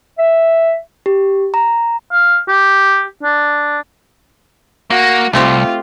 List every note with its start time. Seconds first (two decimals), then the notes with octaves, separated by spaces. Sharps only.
0.18 E5
1.06 G4
1.54 A#5
2.12 F5
2.48 G4
3.23 D4
4.90 A#3 F#4
5.33 C2 A3 C4 F4 G4